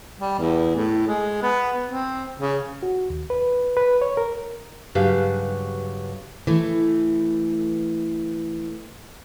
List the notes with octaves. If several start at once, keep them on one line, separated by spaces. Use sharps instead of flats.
G3
E2
A2
G#3
B3
C4
C#3
F#4
D#2
B4
B4
C#5
A#4
G2 C#3 F#3 G4 B4 F5
E3 A3